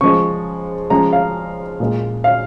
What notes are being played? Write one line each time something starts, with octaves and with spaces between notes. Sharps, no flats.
C#3 F3 G#3 C#6
C#3 F3 G#3 A#5
F5
A#2 G#3
F5